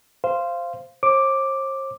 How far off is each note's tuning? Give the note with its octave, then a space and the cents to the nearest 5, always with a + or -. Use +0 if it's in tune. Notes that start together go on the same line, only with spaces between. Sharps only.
C5 +0 F5 -15
C5 +45 D6 +0